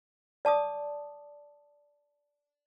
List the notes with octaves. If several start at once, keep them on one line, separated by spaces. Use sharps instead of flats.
D5 A5 D6 D#6